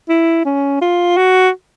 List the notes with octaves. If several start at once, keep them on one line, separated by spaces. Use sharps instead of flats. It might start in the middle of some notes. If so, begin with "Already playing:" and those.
E4
C#4
F4
F#4